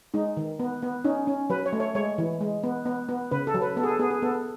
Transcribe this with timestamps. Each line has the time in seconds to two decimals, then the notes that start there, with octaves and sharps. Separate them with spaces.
0.14 G#3 D#4
0.37 D#3
0.59 B3
0.82 B3
1.04 C#4 D#4
1.27 C#4
1.50 F#3 B4
1.66 C#5
1.73 A3
1.80 C#5
1.95 G#3 C#5
2.18 E3
2.41 G#3
2.64 B3
2.86 B3
3.09 B3
3.31 C#3 B4
3.47 A4
3.54 F#3
3.62 B4
3.77 B3 A4
3.83 G#4
3.88 A4
3.99 B3 G#4
4.10 G#4
4.22 B3 A4